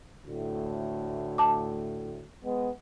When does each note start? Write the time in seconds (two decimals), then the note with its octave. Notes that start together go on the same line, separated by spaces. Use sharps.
0.25 D2 A2
1.38 A5 D6
2.43 G#3 B3